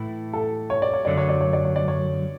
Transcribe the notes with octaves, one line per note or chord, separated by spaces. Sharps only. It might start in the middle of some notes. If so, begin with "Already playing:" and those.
Already playing: A2 E3 A3 E4
A4
C#5
D5
C#5
F#2 D3 F#3 A3 D5
C#5
D5
C#5
D5
C#5
D5
C#5